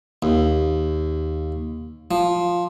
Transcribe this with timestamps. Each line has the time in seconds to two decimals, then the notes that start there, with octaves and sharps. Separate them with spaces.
0.23 D#2
2.11 F3